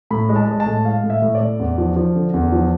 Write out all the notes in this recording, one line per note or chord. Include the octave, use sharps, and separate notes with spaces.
A2 B5
G#3
A5
G#3
A5
A2
G#3 F5
A2
E5
A2
D5
A2
E2
F3
F3
D3
E2
F3